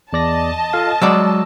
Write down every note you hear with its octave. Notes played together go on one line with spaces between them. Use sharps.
E2 D5 D#5 A5 A#6
F4 A4 F5
F#3 G#3 D5 E6